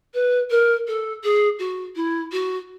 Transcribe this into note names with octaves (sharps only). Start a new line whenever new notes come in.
B4
A#4
A4
G#4
F#4
E4
F#4